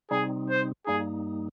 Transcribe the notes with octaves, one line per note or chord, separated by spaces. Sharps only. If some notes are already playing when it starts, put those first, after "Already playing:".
C3 G3 C4 D#4 G#4
C5
G2 G3 A#3 D#4 G#4